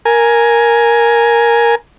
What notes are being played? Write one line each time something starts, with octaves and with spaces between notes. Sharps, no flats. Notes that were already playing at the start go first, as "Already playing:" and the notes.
A#4 G#5